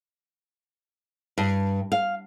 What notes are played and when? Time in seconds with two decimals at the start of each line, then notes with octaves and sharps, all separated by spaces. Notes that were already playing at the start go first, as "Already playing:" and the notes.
1.38 G2
1.92 F5